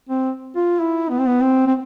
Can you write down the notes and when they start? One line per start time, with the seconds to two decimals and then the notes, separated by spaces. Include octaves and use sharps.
0.09 C4
0.56 F4
0.80 E4
1.10 B3
1.19 C4
1.28 B3
1.41 C4
1.67 C4